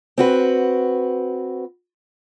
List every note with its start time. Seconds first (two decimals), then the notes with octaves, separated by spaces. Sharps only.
0.18 C4 F#4 B4